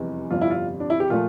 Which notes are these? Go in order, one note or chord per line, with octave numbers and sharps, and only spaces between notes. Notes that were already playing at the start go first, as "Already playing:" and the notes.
Already playing: F1 E2 E3 G3
G1 F2 C3 G3 F4
E4
F4
D4
E4
G4
A#2 F3 A3 F4